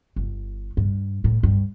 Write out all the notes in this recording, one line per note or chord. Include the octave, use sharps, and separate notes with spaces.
G1
G2
A2
G2